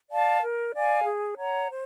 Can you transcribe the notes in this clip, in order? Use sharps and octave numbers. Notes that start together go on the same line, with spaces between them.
D5 F5 A5
A#4
D5 F5 G#5
G#4
C#5 F#5 A#5
C5